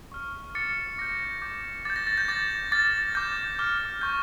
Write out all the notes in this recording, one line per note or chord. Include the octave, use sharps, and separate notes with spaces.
C#6 F6
D6 F6 A6 C#7
D6 G6 A#6
D6 G6
D6 G6 A6
A#6
A6
G6
D6 G6 A6
D6 F6 A6
D6 G6
D6 F6
C#6 G6